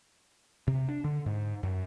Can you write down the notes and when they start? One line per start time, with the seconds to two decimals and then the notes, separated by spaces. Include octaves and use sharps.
0.68 C3
0.89 D4
1.04 D3
1.26 G#2
1.63 F#2